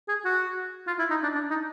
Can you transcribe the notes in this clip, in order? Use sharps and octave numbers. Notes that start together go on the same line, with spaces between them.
G#4
F#4
F4
E4
D#4
D4
D4
D#4